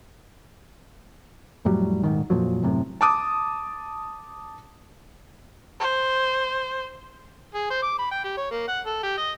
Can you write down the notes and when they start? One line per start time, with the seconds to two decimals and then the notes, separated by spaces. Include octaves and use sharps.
1.65 F2 A2 F#3 G3
2.03 D#1 G#2 D#3
2.30 F2 A#2 F3 F#3
2.63 F#2 A2 C3
3.01 A5 D6 D#6
5.80 C5
7.54 G#4
7.70 C5
7.83 D6
7.99 B5
8.11 G5
8.24 G4
8.37 C#5
8.51 A#3
8.68 F#5
8.86 A4
9.03 G4
9.17 D#5